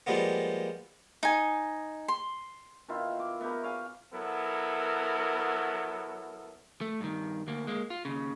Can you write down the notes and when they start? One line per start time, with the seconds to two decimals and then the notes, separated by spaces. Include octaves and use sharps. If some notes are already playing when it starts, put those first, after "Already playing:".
0.07 F3 G3 G#3 A#3 B3
1.23 D#4 G#5
2.08 C6
2.88 B2 D#3 E4 F4
3.20 D6
3.41 B3 E4 G4 A#4
3.63 C#5 F5 G#5
4.13 F#3 B3 E4 A4 A#4
6.81 A3
7.00 G2 D#3
7.48 D2 A#3
7.67 G#3 A#3
7.90 F4
8.05 D#2 C#3